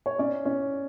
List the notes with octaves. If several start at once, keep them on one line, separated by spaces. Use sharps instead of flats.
C#5
C#4 D5
C#4